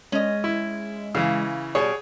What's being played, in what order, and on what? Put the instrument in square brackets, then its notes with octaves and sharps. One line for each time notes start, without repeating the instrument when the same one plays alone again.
[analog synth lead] G#3 [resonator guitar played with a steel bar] C#4 D#5
[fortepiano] E4
[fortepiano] C#3 E3 [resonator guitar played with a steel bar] F5
[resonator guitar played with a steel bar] B2 G3 [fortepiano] G#4 C#5